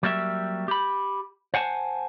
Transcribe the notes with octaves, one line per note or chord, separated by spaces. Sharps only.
F#3 G3 A#3 G4 E5
G4 B5
C5 F#5 G#5 A5